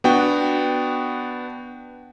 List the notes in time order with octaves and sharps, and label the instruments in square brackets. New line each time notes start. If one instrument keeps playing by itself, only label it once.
[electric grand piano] B3 D4 F#4 G5